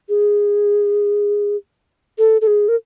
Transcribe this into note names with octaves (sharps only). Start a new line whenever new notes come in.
G#4
A4
A4
G#4
A#4